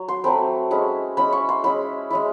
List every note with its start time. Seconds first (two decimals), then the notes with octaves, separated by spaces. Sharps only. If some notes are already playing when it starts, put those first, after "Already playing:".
Already playing: F#3
0.08 C6
0.24 F#3 A3 C4 B5
0.71 G#3 C#4 E4
1.17 G#3 C#4 E4 B5
1.32 C#6
1.49 C6
1.64 G#3 C#4 E4 B5
2.10 G#3 C#4 E4